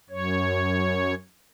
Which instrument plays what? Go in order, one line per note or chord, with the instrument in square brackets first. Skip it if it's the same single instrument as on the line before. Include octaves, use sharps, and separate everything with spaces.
[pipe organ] F#2 C#5